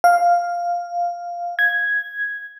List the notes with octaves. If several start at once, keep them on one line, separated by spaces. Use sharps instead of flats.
F5
G#6